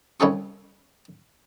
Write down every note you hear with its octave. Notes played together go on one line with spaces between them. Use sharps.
C2 C#3 C#4 D#4 A4 C#6